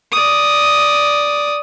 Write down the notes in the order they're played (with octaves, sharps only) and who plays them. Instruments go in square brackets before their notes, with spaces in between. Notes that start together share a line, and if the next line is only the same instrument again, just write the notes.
[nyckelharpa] D5 D#6